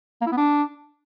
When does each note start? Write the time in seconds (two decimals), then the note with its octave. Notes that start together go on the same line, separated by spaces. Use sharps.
0.21 A#3
0.26 E4
0.32 B3
0.37 D4